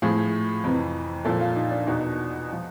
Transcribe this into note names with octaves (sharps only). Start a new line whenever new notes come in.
A2 F3 G#4
F2 C3 E3
A#2 F3 A4
F4
D#4
D4
E2 B2 D#4
F3